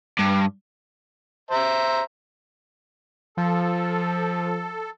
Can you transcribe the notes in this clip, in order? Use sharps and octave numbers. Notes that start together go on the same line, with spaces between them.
G2
C5 E5 A#5
F3 A4